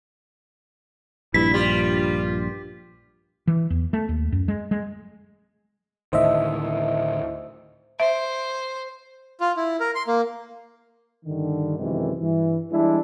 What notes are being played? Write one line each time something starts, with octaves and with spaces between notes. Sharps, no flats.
A#1 G2 E4 B6
G3 F4
E3
E2
A3
D#2
F#2
G#3
G#3
D2 A2 D#3 C5 D#5 E5
C5 E5
F4
E4
A#4
C6
A#3
G2 D3 D#3
F#2 C3 D#3 E3 G#3
G2 E3
E3 G3 G#3 D4 E4